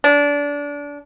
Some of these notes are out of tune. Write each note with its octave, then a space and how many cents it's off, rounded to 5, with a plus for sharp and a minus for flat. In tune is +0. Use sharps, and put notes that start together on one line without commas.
D4 -25